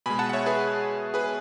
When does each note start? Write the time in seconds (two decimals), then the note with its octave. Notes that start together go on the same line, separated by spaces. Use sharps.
0.06 B2 G#3 G#5 B5
0.19 F#5 A5
0.29 F#5
0.33 C#5 E5
0.46 G#4 B4
1.14 G#4 B4